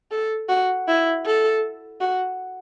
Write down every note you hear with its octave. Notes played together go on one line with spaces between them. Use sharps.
A4
F#4
E4
A4
F#4